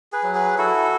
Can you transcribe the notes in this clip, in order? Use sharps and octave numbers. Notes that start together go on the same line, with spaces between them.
G#4 B4
F#3
G#4 B4
E4 F#4 A4